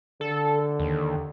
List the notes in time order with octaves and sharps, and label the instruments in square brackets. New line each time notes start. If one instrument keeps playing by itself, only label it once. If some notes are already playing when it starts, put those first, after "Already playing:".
[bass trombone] D3 [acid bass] A4
[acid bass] D#2